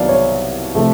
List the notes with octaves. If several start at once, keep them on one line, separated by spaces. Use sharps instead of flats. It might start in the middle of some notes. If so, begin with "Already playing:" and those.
Already playing: C2 C3 D#3 F#3 B3 D5 F5
C#5
C3 F3 A3